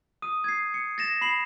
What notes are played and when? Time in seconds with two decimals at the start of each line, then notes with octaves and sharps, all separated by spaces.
0.22 D#6 D#7
0.44 G#6 C7
0.74 C#7
0.98 A6 A#6 E7
1.21 B5 C7 F#7